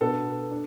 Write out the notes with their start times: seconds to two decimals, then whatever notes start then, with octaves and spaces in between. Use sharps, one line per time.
0.01 B2 B3 D4 A4
0.51 D4